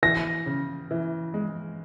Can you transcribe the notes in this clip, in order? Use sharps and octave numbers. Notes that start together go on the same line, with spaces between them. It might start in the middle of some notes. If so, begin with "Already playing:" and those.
E3 A#6
C#3
E3
G#3